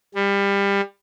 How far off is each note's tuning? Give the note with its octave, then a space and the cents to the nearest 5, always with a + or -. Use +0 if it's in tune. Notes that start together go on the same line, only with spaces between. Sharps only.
G3 +25